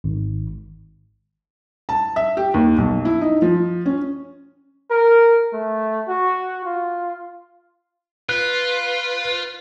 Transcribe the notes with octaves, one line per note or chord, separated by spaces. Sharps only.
G#1
A5
E5
G4
D#2
B1
E4
D#4
F3
C#4
A#4
A3
F#4
F4
F4 B4 F#6